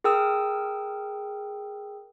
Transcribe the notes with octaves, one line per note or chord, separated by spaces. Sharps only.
G#4 A#4 G5 D#6 E6